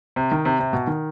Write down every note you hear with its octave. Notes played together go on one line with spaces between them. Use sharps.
C3
D#3
C3
C3
B2
D#3